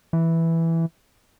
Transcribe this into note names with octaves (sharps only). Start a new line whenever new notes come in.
E3